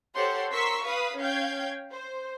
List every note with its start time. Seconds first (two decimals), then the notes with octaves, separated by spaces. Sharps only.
0.15 G4 A4 C5 C#5 F#5 C6
0.53 A#4 C6 C#6 E6 B6
0.87 B4 F5 D#6 B6
1.20 C#4 F5 G5 G6 G#6
1.92 C5